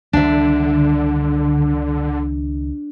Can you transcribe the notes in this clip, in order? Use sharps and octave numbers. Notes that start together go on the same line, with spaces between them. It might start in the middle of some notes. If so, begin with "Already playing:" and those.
C#2 D3 D#3 G3 D4 E5